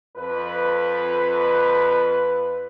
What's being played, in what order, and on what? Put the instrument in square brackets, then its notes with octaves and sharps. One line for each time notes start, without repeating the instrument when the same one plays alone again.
[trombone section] F2 B4